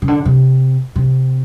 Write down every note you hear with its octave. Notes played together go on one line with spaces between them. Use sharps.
C#3
D3
C3
C3